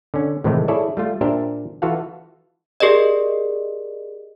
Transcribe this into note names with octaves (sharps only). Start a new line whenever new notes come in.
D3 C#4
A2 C3 D#3 E3 G#3 A3
E4 G#4 A4 C#5 D5 E5
G3 A3 F4
A#2 D4 G4 A#4 C5 E5
E3 F4 F#4 A4 F5 F#5
G4 G#4 A#4 D5 D#5